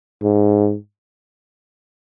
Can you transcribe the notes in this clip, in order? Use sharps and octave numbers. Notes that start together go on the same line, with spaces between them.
G#2